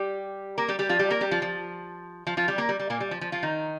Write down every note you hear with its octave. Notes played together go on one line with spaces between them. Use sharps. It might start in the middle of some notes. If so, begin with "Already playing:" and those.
Already playing: G3 G4
A#3 A#4
G3 G4
G3 G4
F3 F4
G3 G4
A#3 A#4
G3 G4
F3 F4
F3
F3 F4
F3 F4
G3 G4
A#3 A#4
G3
G3
A#2 A#3
G3
F3
F3
F3 F4
D#3 D#4